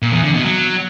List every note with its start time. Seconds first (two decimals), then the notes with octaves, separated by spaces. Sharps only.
0.02 A#2
0.13 E2
0.23 D3
0.34 B2
0.44 F#3